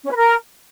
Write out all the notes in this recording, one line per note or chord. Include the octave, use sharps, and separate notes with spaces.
C#4
B4
A#4